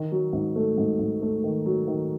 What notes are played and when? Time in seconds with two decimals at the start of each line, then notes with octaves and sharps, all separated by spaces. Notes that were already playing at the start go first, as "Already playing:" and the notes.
Already playing: D#3
0.12 F#3
0.33 G#2
0.56 A3
0.78 G#2
0.99 G#2
1.22 A3
1.44 D#3
1.66 F#3
1.88 D#3